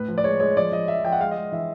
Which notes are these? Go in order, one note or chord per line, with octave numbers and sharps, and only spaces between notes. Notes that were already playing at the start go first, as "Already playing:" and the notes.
Already playing: A2 B4
F3
D5
G#3 C#5
G#3 C#5
F3 D5
F3 D#5
F3 E5
F3 G5
F#5
G#3 F5
D#5
G#3
E3 E5